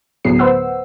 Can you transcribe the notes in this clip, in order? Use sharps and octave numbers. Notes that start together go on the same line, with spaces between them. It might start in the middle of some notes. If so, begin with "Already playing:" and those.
D2 A2 F#3 B3 G#4 C7
B4 C5 F#5 E6